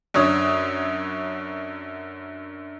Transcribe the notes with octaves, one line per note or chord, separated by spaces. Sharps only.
F#2 D3 D4 C#5 D#6